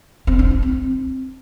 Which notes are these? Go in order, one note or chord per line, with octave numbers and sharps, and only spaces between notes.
C4
D4
D4
C4